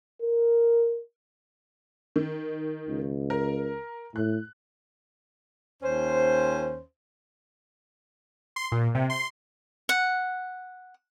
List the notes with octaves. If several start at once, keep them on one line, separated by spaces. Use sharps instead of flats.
A#4
D#3
C#2
A#4
A2 F#6
D#2 C#4 C5
C6
A#2
C3
C6
F#5